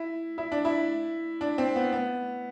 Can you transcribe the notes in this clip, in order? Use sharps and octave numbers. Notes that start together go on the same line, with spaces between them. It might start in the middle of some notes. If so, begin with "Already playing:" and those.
Already playing: E4
E4
D4
E4
D4
C4
B3
B3